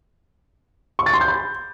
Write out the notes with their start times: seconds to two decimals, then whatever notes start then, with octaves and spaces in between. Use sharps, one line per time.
0.99 C#6
1.06 A6
1.14 C6
1.21 G6
1.28 B5